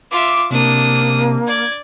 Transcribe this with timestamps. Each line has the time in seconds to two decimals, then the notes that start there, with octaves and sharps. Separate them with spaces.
0.11 F4 E5 D6
0.51 C3 A#3 D4 D#6
1.47 D5 G#6